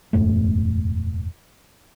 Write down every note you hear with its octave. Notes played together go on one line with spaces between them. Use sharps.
E1 F#2 A2 A3